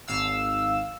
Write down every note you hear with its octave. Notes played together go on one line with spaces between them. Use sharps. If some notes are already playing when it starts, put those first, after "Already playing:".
G#1 F5 E6